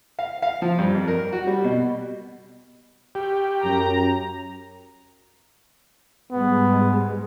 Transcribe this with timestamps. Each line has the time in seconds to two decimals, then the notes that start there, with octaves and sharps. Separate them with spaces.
0.19 F5
0.42 F5
0.62 F3
0.78 G2
0.94 F2
1.08 A#4
1.32 F#4
1.47 G3
1.64 B2
3.15 G4
3.64 F#2 A#5
6.31 G#2 G3 G#3 B3